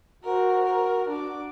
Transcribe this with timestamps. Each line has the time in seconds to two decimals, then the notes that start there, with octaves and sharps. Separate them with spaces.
0.24 F#4 A#4 C5
0.65 A#4
1.09 D4 D6